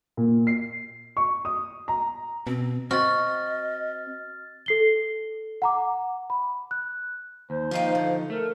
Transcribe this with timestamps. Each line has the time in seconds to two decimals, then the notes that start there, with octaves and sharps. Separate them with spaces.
0.17 A#2
0.47 C7
1.17 C#6
1.45 D#6
1.88 A#5
2.47 B2 C4
2.91 C4 F#4 D#5 F6 A6
4.66 A4 C7 G7
5.62 F#5 A#5 D6
6.30 B5
6.71 F#6
7.50 D#2 C5
7.71 F3 A#3 D#4 F5 G5
7.95 D3
8.30 A3 A#4